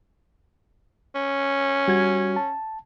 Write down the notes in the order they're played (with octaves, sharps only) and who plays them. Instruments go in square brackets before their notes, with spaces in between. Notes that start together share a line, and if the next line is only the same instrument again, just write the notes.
[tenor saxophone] C#4
[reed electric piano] G3 F#4 G#6
A5